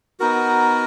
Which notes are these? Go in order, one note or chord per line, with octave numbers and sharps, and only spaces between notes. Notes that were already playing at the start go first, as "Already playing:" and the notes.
B3 D#4 F#4 A#4